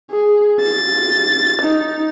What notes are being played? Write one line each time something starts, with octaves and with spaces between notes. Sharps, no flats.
G#4
A6
D#4